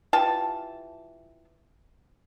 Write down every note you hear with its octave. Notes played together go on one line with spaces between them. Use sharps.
E3 F4 G4 A5